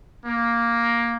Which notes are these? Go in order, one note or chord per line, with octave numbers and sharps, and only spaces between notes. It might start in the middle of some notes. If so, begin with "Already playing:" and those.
A#3